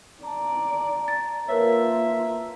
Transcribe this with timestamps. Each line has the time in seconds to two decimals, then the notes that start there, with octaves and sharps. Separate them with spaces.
0.23 D5 A5 A#5
1.08 A6
1.48 A#3 F4 A#4 B4 C#5 E5